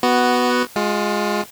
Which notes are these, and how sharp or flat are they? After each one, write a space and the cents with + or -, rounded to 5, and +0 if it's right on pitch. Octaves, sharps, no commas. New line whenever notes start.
B3 +0 F#4 +5
G#3 +0 F4 +25